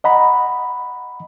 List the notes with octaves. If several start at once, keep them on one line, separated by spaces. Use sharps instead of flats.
D#5 F#5 A#5 B5